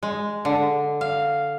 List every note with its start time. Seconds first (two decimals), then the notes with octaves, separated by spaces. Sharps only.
0.03 G#3
0.45 D3
1.01 F5